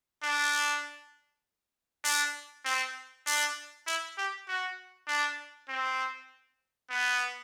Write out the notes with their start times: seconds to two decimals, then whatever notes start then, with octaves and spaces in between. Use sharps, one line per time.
0.23 D4
2.04 D4
2.65 C4
3.26 D4
3.86 E4
4.17 G4
4.48 F#4
5.07 D4
5.68 C4
6.90 B3